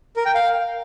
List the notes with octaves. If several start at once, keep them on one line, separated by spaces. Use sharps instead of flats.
A#4
G5
F5